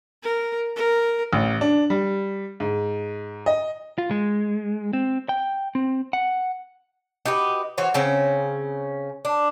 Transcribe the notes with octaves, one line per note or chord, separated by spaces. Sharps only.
A#4
A#4
A1
D4
G3
G#2
D#5
F4
G#3
C4
G5
C4
F#5
D#4 F#4 G4 B4
E3 F#4 C5 C#5
C#3 C4 C#4
D4